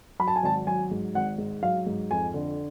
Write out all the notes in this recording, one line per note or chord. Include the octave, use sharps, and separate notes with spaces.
F#3 B5
A5
G#5
G#1 A5
F#3 G#5
G#2
G#1 F#5
G#2
F#3 F5
G#2
F2 G#5
D3